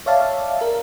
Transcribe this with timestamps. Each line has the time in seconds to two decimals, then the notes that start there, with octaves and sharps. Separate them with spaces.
0.06 C#5 D5 E5 F5 A5
0.61 A#4